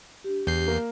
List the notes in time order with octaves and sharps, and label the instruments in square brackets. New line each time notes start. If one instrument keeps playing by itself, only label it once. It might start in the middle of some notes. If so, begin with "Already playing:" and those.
[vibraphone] D4 G4
[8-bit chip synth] E2 G6 C7
[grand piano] A#3